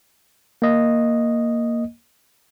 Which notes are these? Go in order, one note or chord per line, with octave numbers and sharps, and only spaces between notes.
A#3 D#5